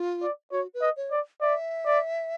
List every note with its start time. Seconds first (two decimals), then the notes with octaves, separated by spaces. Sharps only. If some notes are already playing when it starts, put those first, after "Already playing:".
Already playing: F4
0.22 D5
0.52 F#4 C#5
0.74 B4
0.81 D#5
0.96 C#5
1.11 D5
1.41 D5 E5
1.86 D5